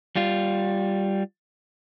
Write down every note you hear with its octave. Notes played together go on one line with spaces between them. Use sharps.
G3 F4